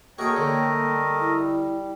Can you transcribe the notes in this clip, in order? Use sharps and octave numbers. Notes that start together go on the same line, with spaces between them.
A3 A#3 F#4 G#4 A#4 C#5 D#5 G5
D3
G3
E4